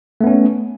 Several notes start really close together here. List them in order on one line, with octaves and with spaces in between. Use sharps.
A3 B3 C#4